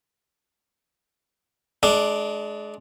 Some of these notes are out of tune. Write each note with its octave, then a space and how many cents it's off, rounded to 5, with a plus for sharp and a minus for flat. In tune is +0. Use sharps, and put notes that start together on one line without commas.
G#3 +30 D4 +0